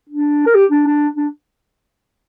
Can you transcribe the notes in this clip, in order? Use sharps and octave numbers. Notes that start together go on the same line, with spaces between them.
D4
A#4
G4
D4
D4
D4